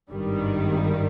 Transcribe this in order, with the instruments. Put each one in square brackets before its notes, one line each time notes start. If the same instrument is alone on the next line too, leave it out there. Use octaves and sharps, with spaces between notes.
[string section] G#1 G2 D#3 G3